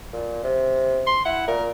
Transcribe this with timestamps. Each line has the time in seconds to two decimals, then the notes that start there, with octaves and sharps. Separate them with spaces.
0.13 A#2
0.43 C3
1.07 C6
1.25 E4 F#5
1.48 A#2 A#4